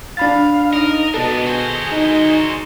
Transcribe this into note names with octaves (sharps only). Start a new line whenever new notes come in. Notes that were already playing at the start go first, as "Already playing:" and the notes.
D4 F5 B5 A6
D#4 A#4 D#5
B2 B3 D4 A4
F#4 G#4 C5
D#4